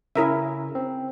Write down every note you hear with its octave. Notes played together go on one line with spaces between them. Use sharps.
C#3 C#4 E4 A#4 E5
C4